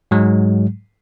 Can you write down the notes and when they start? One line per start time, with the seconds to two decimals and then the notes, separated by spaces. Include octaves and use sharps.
0.11 G#2 F#3 G#3